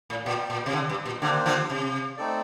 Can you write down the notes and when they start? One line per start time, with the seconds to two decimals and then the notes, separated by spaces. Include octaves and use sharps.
0.10 A2
0.25 A#2 G4 D5 G5
0.50 A#2
0.66 C3
0.73 D3
0.89 G2
1.06 A#2
1.22 D3 A#3 D4 G4 C5
1.46 D3 F3
1.70 C3
2.17 A3 C4 D#4 A4 D5